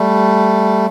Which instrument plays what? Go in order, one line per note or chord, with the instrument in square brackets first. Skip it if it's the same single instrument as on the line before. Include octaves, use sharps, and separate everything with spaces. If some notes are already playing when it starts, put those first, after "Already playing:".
Already playing: [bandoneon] G3 A3